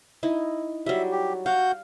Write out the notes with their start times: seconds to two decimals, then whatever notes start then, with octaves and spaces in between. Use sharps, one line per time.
0.23 D#4 E4
0.86 F#3 G3 E5
1.12 G4
1.46 F#4 F5 F#5 G6